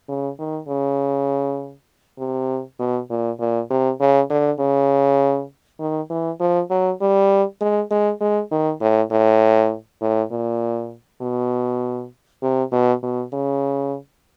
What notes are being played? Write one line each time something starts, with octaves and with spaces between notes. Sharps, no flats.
C#3
D#3
C#3
C3
B2
A#2
A#2
C3
C#3
D3
C#3
D#3
E3
F3
F#3
G3
G#3
G#3
G#3
D#3
A2
A2
A2
A#2
B2
C3
B2
B2
C#3